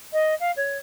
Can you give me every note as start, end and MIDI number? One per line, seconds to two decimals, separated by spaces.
0.13 0.35 75
0.40 0.52 77
0.56 0.77 73